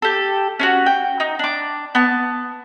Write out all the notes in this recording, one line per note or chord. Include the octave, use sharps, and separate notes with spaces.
G4 A4
C#4 D4 F#4
G5
D#4
D4 D6
B3 A5